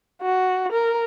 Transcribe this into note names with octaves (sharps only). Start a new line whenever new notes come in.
F#4
A#4